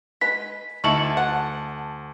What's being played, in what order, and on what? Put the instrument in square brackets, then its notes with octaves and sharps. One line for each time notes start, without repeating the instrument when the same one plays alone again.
[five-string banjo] G#3 B4 [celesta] B6
[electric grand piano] D2 A5 C#7 [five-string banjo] D#4 E4 [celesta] C#6 F#7
[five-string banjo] F#5